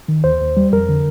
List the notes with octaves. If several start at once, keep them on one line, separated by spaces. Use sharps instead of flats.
D#3
D#2 C5
D#2
G3
F2 A#4
D3